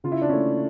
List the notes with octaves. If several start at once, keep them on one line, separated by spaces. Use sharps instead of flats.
C#3 F4
E4
D4
A3 C#4 E4